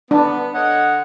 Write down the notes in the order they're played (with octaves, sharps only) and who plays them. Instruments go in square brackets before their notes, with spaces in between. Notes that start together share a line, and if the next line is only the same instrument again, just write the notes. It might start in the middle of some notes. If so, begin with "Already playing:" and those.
[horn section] B3 [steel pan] D4
[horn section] D3 C#5 D#5 [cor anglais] F#5